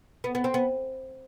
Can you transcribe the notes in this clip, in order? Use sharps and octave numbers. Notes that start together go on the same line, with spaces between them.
B3
B3
C4
B3